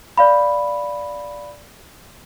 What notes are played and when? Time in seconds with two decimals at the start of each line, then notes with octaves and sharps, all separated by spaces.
0.17 D5 F5 B5